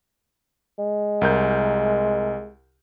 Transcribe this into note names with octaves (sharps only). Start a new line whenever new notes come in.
G#3
C2 A#4 G6